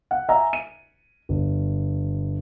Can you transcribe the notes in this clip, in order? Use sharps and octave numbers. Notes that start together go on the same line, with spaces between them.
F#5
E5 G#5 A#5
D#7
G1